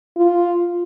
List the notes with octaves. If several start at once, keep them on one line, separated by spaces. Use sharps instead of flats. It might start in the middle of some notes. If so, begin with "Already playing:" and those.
F4